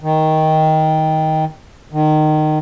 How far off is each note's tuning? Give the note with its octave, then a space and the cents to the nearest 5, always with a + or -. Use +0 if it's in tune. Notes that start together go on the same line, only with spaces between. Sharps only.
D#3 +15
D#3 -20